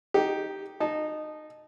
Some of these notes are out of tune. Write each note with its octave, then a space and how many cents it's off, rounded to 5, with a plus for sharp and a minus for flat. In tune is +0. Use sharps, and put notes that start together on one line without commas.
D#4 +0 G4 -5
D#4 -20 A5 -20